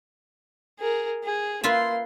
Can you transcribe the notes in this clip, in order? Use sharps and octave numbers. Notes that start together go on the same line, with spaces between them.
G#4 A#4
G#4
A#3 F4 B4 E5 C6